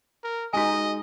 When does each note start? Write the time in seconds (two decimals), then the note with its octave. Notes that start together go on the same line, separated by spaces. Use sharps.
0.24 A#4
0.53 G#3 D#4 F#4 D#5 G#5